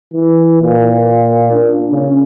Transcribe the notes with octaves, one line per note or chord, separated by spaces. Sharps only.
E3
A#2
D4
C#3